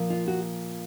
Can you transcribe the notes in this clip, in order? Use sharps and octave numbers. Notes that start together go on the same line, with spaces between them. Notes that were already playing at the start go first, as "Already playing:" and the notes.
Already playing: A#2 F3
F4
F#4